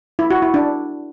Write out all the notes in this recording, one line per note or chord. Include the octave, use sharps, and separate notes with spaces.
E4
F#4
E4
D4